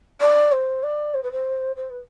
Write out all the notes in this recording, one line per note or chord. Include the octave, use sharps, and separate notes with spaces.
D5
C5
D5
C5
B4
C5
C5
B4